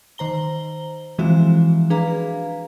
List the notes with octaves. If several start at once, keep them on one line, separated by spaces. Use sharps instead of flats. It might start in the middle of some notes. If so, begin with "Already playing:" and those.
D#3 C5 A#5 G7
E3 F3 G#3 C4 F#4 E5
D4 G#4 B4 F5 A#5